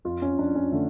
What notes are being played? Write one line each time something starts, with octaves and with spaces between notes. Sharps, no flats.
F2 F4
C#4
F2 D4
C#4
D3 A3